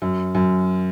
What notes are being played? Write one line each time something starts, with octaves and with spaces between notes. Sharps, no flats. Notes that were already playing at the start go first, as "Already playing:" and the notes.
F#2
F#2